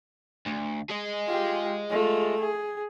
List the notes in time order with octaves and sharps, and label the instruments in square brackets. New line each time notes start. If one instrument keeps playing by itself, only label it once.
[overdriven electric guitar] D2
G#4 D#5
[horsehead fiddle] F4 G4
A3 F4
G#4